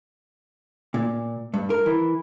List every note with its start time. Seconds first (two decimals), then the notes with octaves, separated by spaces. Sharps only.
0.94 A#2
1.54 G2
1.70 A#4
1.86 E3